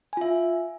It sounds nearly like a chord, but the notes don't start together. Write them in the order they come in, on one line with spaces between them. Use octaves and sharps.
G#5 F4 E5